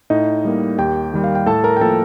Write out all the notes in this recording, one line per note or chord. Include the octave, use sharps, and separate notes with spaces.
A2 D#4 D#5
G3 A#3
D#2 G4 G5
D#3 G3
F5
G5
A2 A4 A5
A#4 A#5
G5
F3 A#3 A4 A5